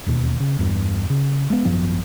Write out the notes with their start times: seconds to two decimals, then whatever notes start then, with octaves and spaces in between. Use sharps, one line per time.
0.06 E1 D#2 B2
0.40 C#3
0.59 E2 G2
1.10 C#3
1.50 G#3 B3
1.65 G#1 F#2 F3 B3